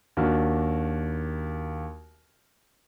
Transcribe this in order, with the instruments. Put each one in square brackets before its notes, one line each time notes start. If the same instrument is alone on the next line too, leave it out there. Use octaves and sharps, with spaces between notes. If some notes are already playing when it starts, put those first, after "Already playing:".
[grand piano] D#2 D4 F#4 A#4 F6